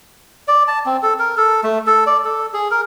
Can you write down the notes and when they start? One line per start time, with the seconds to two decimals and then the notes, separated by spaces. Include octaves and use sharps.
0.48 D5
0.68 A5
0.86 C4
1.03 A4
1.19 A#4
1.37 A4
1.64 A3
1.87 A4
2.07 D5
2.25 A4
2.53 G#4
2.71 A#4